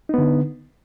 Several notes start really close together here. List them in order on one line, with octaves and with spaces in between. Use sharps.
D#4 B3 D3